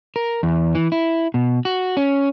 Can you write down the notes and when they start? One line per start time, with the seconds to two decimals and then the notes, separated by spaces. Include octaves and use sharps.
0.16 A#4
0.43 E2
0.75 E3
0.92 E4
1.34 B2
1.65 F#4
1.97 C#4